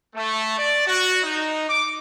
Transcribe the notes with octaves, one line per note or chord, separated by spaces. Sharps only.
A3
D5
F#4
D#4
D6